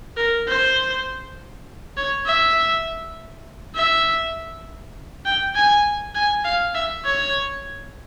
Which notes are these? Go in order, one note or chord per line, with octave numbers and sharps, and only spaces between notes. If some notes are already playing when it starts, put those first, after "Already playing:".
A#4
C5
C#5
E5
E5
G5
G#5
G#5
F5
E5
C#5